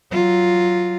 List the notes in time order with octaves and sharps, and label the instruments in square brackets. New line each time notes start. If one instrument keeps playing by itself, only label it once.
[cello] F#3 F4